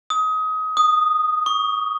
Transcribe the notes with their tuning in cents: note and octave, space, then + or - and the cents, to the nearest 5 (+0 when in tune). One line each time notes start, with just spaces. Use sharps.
D#6 +25
D#6 -5
C#6 +40